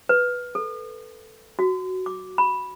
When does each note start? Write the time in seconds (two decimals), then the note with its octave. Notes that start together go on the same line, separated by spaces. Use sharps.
0.09 B4
0.55 A4
1.59 F#4
2.06 D6
2.38 B5